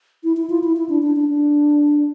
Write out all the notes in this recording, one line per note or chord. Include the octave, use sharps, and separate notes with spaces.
E4
E4
F4
E4
E4
D4
D4
D4
D4